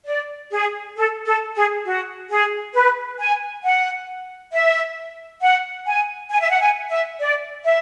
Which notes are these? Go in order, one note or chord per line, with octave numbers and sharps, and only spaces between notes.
D5
G#4
A4
A4
G#4
F#4
G#4
B4
G#5
F#5
E5
F#5
G#5
G#5
E5
F#5
G#5
E5
D5
E5